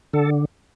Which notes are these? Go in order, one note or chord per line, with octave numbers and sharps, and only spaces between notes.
D3 A4